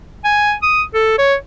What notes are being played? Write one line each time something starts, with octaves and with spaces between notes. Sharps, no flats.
G#5
D#6
A4
C#5